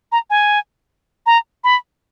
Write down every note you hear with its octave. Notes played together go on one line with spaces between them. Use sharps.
A#5
G#5
A#5
B5